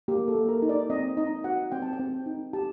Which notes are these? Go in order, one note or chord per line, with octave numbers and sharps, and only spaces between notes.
A#3 G4
A4
A#3
A#4
D#4
D5
C4 D#5
D#4 D#5
F#4 F#5
C4 G5
A5
G5
C4
D#4
G4 A5